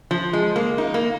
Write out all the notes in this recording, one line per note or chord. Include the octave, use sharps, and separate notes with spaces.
F3
G#3
A#3
D#4
A#3